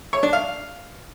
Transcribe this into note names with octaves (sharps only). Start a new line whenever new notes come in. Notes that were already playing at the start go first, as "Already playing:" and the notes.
C#5
D4
F5